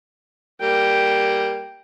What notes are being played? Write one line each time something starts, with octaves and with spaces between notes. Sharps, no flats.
G3 A#3 G5